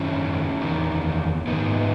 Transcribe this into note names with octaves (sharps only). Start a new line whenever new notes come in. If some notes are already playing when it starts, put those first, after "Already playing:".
Already playing: F#2 D#3 C#4 E4
E2 D#3
G#2 D#3 B3 D#4